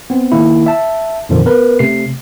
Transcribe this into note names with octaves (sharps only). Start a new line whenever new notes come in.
B3 C4
D#3 A#3 E4
E5 A5
F2 A#2 D3 D#3 F3
B3 A#4 B4
C3 A3 C7